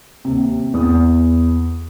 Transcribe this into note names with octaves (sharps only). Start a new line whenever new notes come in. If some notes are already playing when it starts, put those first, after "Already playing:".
D#2 C3
E2 D#6